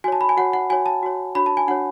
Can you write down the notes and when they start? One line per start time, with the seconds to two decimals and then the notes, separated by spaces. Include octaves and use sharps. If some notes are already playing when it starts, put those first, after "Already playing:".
0.04 F#4 G#5
0.08 C#5 A5
0.21 B5
0.29 G#5
0.37 F#4 C#5 F#5
0.53 F#5
0.70 F#4 C#5 G#5
0.86 A5
1.03 F#4 C#5
1.35 D4 F#4 C#5 B5
1.46 A5
1.57 G#5
1.68 D4 F#4 C#5 F#5